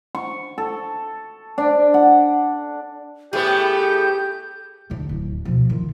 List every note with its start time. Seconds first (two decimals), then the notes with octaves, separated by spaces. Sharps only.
0.15 C#6
0.58 A4
1.58 D4
1.94 F#5
3.33 A2 A3 B3 G4 G#4 G6
4.90 A#1 D3
5.09 D1
5.45 B2 F3
5.70 D#3 F4